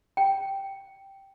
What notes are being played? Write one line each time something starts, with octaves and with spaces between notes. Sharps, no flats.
G5